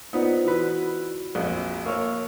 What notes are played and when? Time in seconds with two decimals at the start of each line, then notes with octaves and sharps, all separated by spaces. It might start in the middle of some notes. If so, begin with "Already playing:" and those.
0.13 B3 D#4 F4 C5 D5
0.45 E3 F#4 B4
1.35 A#1 F2
1.85 A#3 C#5 C#6 E6 F6